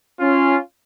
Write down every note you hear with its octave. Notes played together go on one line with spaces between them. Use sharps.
C#4 F4